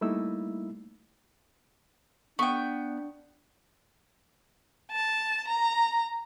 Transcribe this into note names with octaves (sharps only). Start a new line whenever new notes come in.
G3 A3 A#3 D#4 E4 E6
B3 D4 G5 C#6
A5
A#5